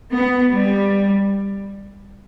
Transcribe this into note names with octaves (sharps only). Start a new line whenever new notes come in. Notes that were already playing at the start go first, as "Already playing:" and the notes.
B3
G3